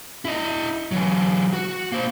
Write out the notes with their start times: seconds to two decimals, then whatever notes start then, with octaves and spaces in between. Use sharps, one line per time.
0.25 E4 D#5
0.91 E3 F#3
1.53 F#4
1.92 A#3 C5